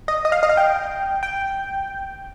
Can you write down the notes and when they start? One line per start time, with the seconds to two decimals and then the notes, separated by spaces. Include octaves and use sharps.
0.08 D#5
0.25 D#5
0.32 F5
0.43 D#5
0.49 F5
0.57 G5
1.23 G5